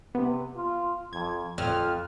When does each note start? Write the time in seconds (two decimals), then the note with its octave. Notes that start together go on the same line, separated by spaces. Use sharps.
0.15 C3 B3
0.56 F4
1.13 F2 G#6
1.58 G#1 F2 F3 F6